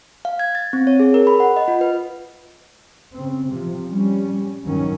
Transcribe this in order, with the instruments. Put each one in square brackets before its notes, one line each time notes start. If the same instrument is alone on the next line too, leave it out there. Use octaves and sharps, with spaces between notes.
[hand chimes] F5
G#6
A6
C4
C#5
G#4
A#4
B5
F#5
D#5
F4
B4
[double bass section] C#3 C4
C3 F3
G3 C#4
G2 D#3 F#3 C#4